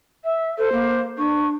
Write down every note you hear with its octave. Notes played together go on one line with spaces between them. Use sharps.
E5
A4 C5
A#3
D4 C#6